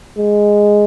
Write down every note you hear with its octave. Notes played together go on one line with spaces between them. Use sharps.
G#3